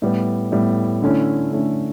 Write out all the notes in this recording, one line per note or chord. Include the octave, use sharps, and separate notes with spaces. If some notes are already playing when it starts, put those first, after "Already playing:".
A2 G3 B3
A2 G3 B3
D3 A3 C#4 E4
D3 A3 C#4 E4